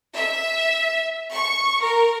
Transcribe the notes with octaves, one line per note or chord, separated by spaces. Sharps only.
E5
C#6
A#4